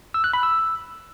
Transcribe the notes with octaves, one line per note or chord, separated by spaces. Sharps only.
E6
F#6
B5
E6